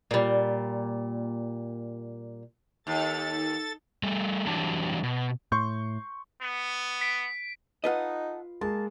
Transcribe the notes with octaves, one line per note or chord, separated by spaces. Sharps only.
A#2 G3
D#2 A4 A6
G3 A3
E3 F#3 G3 D4 A5
B2
A2 C6 C#6 G6
B3
B6 D7
D#4 F4 A4 B4 D#5 F#5
G#3 A#3 A5